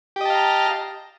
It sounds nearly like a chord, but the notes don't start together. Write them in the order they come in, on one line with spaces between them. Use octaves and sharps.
G4 D#5 A5 F5 A#5